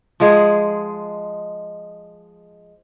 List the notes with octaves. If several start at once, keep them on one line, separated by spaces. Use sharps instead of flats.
F3 G#3 G#4 F#5